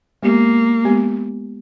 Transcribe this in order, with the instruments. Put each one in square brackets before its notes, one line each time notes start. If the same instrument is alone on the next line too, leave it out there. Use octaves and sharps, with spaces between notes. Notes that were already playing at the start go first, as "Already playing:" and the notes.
[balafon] G#3 B3 G4 [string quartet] A#3
[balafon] G#3 B3 G4